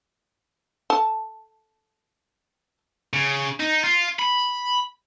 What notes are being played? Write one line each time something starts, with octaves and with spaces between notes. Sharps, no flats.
A4 A5
C#3
D#4
F4
B5